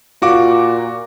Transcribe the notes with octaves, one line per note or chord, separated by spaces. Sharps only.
A#2 F4 F#4 D6